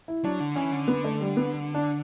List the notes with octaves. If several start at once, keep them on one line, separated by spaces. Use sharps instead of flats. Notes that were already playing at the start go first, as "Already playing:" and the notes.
E4
F#3 D4
D3
E3 C#4
D3
B3
A3
G3
B3
D4